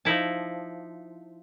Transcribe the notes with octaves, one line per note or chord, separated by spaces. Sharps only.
F3 D#4 E4 A5